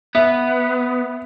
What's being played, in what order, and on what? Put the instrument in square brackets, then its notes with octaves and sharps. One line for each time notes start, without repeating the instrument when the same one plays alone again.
[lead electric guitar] B3 [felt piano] E5